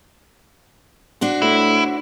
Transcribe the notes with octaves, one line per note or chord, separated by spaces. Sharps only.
D4 F#4 C5
A2 E4